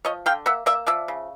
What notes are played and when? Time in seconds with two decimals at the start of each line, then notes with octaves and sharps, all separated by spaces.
0.05 F3 C#5 D#5
0.26 D3 F5 G5
0.46 A#3 E5 F#5
0.66 A#3 D5 E5
0.87 F3 D5 E5
1.08 C#3